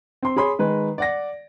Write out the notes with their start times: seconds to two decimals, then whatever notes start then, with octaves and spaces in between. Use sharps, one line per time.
0.23 C4 C6
0.36 G#4 C#5 B5 C6
0.59 D#3 G#3 B4
0.98 D5 F#5 A#6